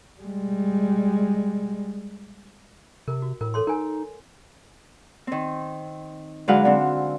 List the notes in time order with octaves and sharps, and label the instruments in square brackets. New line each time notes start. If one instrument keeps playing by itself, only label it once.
[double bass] G3 G#3
[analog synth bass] C3 [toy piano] A#4
[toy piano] F#4
[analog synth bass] A2 [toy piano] A#4
[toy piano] A4 C#5 C6
[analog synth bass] D#4 [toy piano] A#4 G#5
[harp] D#3 C4
D3 F#3 G#3 B4 F5 F#5
D3 C4